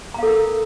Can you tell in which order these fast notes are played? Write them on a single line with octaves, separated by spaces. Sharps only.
A#5 F5 A4 A#4